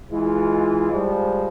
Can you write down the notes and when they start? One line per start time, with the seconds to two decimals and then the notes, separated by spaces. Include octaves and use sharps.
0.10 E3 G#3 F4
0.91 F3 G3 G#3